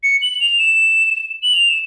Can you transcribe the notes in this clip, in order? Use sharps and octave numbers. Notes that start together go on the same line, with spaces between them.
C#7
F#7
F7
E7
F#7
F7
E7